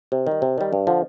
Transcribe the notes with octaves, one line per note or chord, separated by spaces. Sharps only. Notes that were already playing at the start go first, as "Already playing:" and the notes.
C3
D#3 G3
C3
D#3 G3
G2
D3 F3